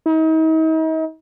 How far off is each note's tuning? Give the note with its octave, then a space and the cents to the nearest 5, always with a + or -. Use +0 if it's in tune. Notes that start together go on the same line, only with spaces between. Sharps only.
D#4 +40